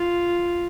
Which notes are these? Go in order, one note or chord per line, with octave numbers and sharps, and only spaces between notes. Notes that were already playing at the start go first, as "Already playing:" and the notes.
Already playing: F4